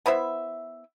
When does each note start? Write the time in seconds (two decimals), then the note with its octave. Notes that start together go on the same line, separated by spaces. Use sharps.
0.06 B3 E4 C5 E5